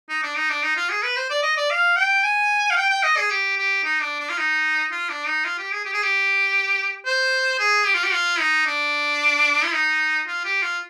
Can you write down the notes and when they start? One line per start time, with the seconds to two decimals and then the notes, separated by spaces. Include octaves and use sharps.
0.09 D#4
0.23 D4
0.36 D#4
0.50 D4
0.63 D#4
0.76 F4
0.90 G#4
1.03 B4
1.16 C5
1.30 D5
1.43 D#5
1.57 D5
1.70 F5
1.97 G5
2.23 G#5
2.70 F5
2.77 G5
2.90 G5
3.03 D#5
3.17 G#4
3.31 G4
3.58 G4
3.84 D#4
4.02 D4
4.20 D4
4.29 F4
4.38 D#4
4.92 F4
5.09 D4
5.27 D#4
5.45 F4
5.58 G4
5.72 G#4
5.85 G4
5.94 G#4
6.03 G4
7.06 C5
7.59 G#4
7.86 G4
7.95 F4
8.04 G4
8.13 F4
8.39 D#4
8.66 D4
9.64 F4
9.73 D#4
10.27 F4
10.45 G4
10.63 F4